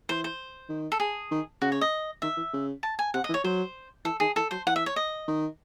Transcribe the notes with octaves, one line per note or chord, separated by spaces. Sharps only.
E3 C5
C5
D#3
A4
G#4
D#3
C#3 F#4
C#5
D#5
D#3 E5
E3
C#3
A5
G#5
C3 F#5
D#5
E3
C#5
F#3 C5
E3 A4
D#3 G#4
E3 A4
F#3 C5
E3 F#5
E5
C#5
D#5
D#3